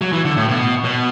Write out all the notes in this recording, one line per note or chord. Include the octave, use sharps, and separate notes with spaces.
F#3
E3
D3
A2
B2
B2